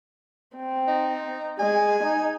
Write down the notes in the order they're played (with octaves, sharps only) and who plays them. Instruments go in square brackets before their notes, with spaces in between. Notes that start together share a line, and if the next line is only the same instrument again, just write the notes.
[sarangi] C4
[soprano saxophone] D#4
[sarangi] G#3 [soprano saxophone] G#5
[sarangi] D#4